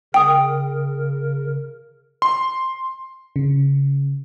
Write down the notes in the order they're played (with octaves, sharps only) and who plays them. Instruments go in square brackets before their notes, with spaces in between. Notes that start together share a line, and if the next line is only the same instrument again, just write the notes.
[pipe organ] C#3 A#4 [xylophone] G5 D#6
[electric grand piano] C6
[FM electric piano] C#3